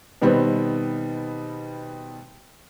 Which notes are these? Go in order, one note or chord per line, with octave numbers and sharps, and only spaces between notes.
B2 D#3 G3 B3 C4